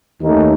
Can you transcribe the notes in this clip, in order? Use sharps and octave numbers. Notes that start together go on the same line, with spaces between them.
D#2 D#3 A3 C#4 D#4